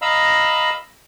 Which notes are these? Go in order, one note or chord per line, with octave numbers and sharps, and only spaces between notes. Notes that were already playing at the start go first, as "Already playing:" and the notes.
D#5 F5 A#5 B5 E6